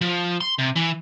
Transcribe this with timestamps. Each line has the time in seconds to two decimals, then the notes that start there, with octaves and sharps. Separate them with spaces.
0.01 F3
0.40 C6
0.58 C3
0.76 E3